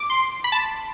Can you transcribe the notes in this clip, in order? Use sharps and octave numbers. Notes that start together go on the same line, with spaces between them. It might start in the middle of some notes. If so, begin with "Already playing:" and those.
Already playing: D6
C6
B5
A5